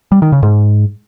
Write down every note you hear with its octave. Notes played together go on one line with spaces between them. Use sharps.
G3
D#3
C#3
G#2